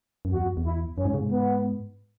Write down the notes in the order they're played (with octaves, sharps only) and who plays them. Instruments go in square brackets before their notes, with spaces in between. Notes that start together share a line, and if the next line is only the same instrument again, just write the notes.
[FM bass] F#2
[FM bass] E2 [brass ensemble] F#4
[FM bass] F#2
E2
[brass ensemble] E4
[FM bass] F#2 [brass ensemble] C#4
[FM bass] G#2
C#3
G#2
[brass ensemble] B3